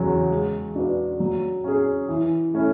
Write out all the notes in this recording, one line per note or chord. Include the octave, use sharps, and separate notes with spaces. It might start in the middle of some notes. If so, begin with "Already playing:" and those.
Already playing: E2 C#3 F#3
G#3
D4 F#4 B4 D5
F#3
C#4 G#4
E3
A3 C#4 E4